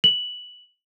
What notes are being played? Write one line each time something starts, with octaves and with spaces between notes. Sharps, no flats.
F#7